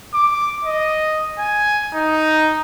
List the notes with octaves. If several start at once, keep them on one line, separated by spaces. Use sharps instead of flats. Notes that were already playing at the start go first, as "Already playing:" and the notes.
D6
D#5
G#5
D#4